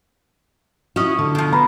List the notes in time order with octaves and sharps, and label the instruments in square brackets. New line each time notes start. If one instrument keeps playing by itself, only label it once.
[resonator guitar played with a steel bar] C#4 D#5 [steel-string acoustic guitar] E4 F#4
[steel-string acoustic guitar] D3
[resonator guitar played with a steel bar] B2 F3
[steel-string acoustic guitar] B3 [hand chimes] A#5 B5